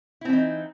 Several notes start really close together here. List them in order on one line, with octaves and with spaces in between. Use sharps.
E4 C4 E3 D#4